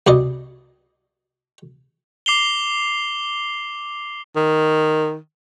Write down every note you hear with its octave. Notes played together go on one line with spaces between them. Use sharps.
C2 B2 D5 D#5
D6 C7 F7 G7
D#3